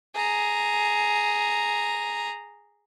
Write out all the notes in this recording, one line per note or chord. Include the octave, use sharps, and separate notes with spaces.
G#4 A#5